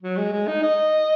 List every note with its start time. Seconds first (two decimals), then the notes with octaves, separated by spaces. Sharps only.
0.02 F#3
0.17 G#3
0.32 G#3
0.48 D#4
0.63 D#5